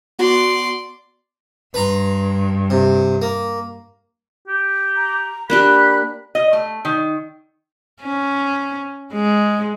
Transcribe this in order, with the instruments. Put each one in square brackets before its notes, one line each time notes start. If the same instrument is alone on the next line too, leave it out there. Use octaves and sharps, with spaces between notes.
[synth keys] B3 F#4 [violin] D5 C6
[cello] G2 [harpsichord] B4 A#5 C6
[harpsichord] C3
A#3
[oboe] G4
[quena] A#5
[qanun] A#3 D4 G4 [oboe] B5 [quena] F#6
[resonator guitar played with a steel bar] D#5
A3
D#3
[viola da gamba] C#4
G#3